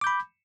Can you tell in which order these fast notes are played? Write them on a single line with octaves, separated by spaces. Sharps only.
D6 G6 B5